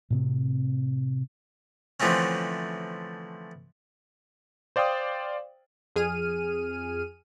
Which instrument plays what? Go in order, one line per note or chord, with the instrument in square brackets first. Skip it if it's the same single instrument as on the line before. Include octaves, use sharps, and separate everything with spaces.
[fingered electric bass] A2 C3 C4
[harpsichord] D3 E3 F3 A3 C4 C#4
[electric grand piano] C5 D5 F5 G5 D#6
[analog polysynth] F2 G#4 F6 D#7